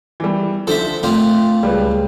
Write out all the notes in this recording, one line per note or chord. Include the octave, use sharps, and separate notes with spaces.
E3 G3
D3 F3 A4 C5 E5
A#2 A3 C4 F4
C#2 G3 G#3 B4